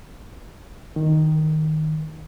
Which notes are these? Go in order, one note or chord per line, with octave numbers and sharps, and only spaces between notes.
D#3